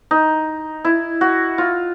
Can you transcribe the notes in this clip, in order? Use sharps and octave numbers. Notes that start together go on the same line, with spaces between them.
D#4
E4
F#4
F4